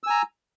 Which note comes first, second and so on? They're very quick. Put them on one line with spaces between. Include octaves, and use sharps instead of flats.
E6 G#5 A#5